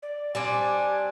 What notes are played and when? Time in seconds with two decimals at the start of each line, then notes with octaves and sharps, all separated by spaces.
0.03 D5
0.35 G3 C4 D4 G#5